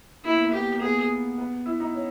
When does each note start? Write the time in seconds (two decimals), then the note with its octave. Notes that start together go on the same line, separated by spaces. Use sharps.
0.25 A#3 E4
0.34 B3
0.42 A#3
0.53 B3 G4
0.76 A#3
0.81 B3 G#4
1.38 B3
1.66 E4
1.80 D#4
1.95 C#4